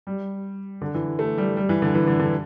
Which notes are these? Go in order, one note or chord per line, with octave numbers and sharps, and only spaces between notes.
G3
D3
E3
A3
G3
G3
E3
D3
E3
D3
D3